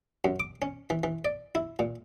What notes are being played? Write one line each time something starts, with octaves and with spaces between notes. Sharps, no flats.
F#2
D6
C#4
E3
E3
D5
E4
A#2